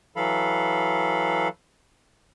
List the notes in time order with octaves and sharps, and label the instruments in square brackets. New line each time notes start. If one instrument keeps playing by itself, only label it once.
[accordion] E3 F#3 A4 F5 B5